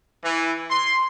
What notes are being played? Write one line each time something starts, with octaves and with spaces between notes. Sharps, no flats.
E3
C6